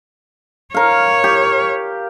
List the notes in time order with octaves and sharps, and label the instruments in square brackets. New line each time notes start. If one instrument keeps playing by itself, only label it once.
[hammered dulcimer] A#4 F5 [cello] C#5
[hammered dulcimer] G4